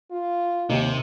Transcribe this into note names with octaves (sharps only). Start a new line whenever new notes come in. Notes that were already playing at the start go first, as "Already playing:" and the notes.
F4
D#2 C3 D#4